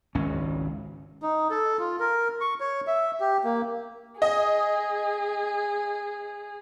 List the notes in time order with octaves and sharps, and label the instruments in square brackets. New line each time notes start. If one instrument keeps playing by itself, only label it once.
[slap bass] G#1 C#2 C#4
[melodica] D#4
A4
F4
A#4
C#6
C#5
E5
G4
A#3
[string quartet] G#4 [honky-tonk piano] D#5